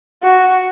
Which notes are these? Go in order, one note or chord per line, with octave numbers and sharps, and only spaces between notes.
F#4